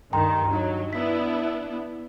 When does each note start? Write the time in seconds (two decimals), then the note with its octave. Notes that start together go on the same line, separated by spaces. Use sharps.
0.13 D2 G2 D#3 G5 A#5 C6
0.51 F#3 D4 D#4 D#5
0.93 B3 D4 E4 B6